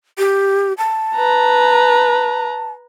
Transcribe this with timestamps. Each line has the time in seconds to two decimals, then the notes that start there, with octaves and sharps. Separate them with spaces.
0.18 G4
0.78 A5
1.17 B4 A#5